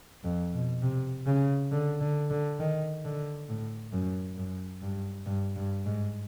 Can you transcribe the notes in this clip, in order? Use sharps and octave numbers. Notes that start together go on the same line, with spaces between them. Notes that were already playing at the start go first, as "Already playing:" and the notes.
F2
B2
C3
C#3
D3
D3
D3
D#3
D3
A2
F#2
F#2
G2
G2
G2
G#2